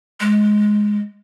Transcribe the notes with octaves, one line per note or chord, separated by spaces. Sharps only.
G#3